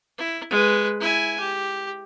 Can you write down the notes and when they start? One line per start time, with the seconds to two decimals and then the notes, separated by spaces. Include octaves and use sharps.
0.18 E4
0.50 G#3 B4
1.01 E4 G#5
1.40 G4